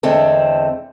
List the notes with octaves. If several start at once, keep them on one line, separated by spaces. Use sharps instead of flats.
E2 D3 G#3 A3 C4